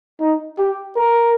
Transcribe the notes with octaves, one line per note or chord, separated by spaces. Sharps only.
D#4
G4
A#4